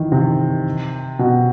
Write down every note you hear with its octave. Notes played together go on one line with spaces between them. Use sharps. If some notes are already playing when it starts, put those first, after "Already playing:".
Already playing: D#3 E3
C3
B2